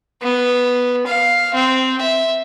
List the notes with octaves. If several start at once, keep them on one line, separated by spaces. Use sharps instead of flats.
B3
F5
C4
E5